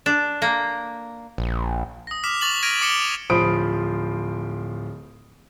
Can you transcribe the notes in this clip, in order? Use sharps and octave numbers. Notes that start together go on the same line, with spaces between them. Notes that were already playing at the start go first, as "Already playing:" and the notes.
D4
A#3
A#1
D#6 A#6
D6 F6 B6 E7
C#6 A6 F7 F#7
F6 G#6 A#6 D7 D#7
D6 C#7 E7 G7
D1 F3 C5 B5 D#6 D7